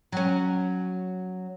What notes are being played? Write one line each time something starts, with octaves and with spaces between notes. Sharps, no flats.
F#3 C#4